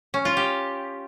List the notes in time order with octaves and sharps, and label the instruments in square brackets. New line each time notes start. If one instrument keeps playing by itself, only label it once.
[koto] C#4
F4
G4